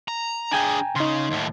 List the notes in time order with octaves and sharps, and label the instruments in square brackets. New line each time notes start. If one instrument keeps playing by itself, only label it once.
[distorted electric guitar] A#5
[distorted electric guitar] D4 G#4 [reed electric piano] G5 G#5 A#5
[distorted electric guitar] C#3 [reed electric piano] D#4 C6
[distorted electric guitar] D#2 A2